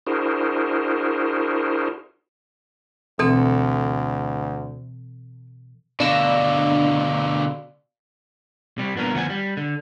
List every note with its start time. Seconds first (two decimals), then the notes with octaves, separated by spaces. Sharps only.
0.07 D4 E4 F#4 G#4 A#4 C5
3.19 D2 B2 E3 C4 A4
6.00 B2 D3 D4 D5 F5 E6 A#6
8.78 C3 G3
8.95 C2 A#2 B3 D4 A#4
9.13 D2 F3 B3 F#5 G#5
9.30 G3
9.57 D3